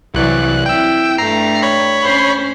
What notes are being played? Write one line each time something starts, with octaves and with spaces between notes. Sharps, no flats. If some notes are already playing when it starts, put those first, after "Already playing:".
C2 E3 F#3 D5 F#6
C4 E4 G5 E6
G2 G3 A3 A#5 C7
C#5 B5
C#4 C5